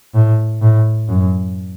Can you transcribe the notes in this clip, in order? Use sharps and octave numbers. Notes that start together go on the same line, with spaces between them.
A2
A2
F#2